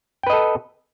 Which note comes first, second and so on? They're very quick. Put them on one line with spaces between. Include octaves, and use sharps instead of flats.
G5 B4 D#5 A4